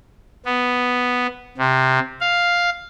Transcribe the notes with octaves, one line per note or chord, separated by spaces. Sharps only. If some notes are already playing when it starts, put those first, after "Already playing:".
B3
C3
F5